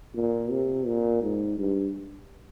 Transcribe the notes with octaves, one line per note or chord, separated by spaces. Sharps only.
A#2
C3
A#2
G#2
G2